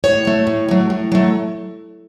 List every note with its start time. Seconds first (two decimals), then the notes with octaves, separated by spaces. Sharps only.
0.04 A2 C#5
0.25 F#3 A3
0.47 A2
0.69 F#3 A3
0.90 A2
1.12 F#3 A3